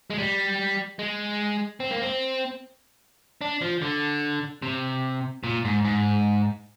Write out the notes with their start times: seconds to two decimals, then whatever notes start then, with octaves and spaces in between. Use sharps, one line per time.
0.10 G#3
0.18 G3
0.99 G#3
1.80 C4
1.91 A#3
2.02 C4
3.41 D4
3.62 F3
3.82 D3
4.62 C3
5.43 A#2
5.65 G#2
5.84 G#2